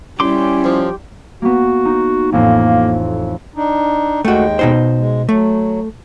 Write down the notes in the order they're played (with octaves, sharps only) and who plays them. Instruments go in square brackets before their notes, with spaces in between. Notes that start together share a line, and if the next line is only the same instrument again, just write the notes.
[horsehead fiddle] G3 E4 [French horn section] C#4 [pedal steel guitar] G4 C6 D6
[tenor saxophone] F3
[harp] A#3 B3 [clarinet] F#4
[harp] D#4
[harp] A1 F2 A2 [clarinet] A#3
[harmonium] D4 D#4
[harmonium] D#2 G#3 G5 [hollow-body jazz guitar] A3 F#4
[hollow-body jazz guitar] B2 D#4 C5
[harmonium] G#3
[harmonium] F#3 [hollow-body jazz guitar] A3